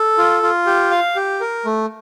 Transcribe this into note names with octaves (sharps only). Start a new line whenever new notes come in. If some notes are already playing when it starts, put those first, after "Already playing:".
Already playing: A4
F4
F4
G4
F5
G4
A#4
A3